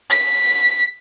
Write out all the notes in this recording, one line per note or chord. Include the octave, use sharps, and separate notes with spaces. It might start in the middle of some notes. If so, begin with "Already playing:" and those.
B6